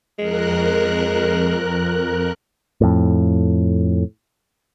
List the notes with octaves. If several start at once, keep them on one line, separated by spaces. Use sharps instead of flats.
F2 G#3 A#4 F#6
F2 A2